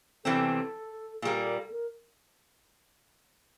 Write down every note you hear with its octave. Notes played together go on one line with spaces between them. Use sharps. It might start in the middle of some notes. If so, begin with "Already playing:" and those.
E2 C3 E3 G3 C4 A4
A#2 G3 A#3 G#4
A4
A#4
A4
A#4